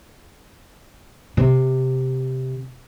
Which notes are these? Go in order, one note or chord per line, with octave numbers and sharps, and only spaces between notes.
C3